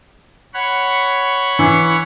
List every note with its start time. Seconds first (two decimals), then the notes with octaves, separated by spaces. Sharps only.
0.54 C#5 F#5 B5
1.59 E3